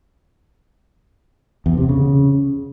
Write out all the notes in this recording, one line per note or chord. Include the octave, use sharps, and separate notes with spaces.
E2
C3
C#3